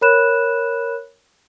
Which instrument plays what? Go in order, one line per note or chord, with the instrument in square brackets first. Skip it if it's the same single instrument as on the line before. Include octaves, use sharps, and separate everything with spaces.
[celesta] A#4 C#5 B5 F#6 E7